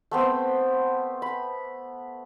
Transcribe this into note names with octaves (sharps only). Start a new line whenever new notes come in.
A3 B3 C4
B5